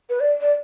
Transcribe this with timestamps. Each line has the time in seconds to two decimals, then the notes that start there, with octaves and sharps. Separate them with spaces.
0.09 B4
0.20 D5
0.41 D5